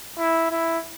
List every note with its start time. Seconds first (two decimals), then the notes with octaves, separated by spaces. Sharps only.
0.18 E4
0.51 E4